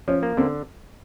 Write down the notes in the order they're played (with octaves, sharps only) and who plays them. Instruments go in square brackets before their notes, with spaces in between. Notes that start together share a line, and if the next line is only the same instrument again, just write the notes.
[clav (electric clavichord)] F3 [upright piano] C#4
[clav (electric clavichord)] A#3
[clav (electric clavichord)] D3 [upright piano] C4